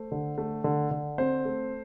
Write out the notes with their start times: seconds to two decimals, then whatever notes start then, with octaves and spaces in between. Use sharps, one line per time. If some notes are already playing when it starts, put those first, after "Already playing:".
Already playing: A3 C5
0.12 D3
0.38 A3
0.64 D3
0.91 D3
1.18 C4 C5
1.45 A3